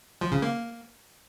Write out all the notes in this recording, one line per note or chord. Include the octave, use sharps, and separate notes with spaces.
F3
C#3
A#3